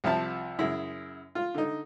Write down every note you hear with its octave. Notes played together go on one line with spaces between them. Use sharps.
C2 F3 E5 A5
F#2 C#3 E4
F4
D3 D#4